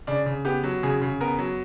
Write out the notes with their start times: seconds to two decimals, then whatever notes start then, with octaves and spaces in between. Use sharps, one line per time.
0.07 C#3 D4
0.26 C#3
0.45 B3 G4
0.64 F#3
0.83 C#3 G#4
1.01 C#3
1.21 B3 A#4
1.39 F#3